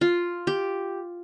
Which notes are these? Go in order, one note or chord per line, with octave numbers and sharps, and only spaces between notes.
F4
G4